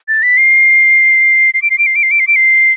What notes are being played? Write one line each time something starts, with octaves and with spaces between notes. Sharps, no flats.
A6
B6
C7
C7
D7
C7
D7
C7
D7
C7
D7
C7
D7
C7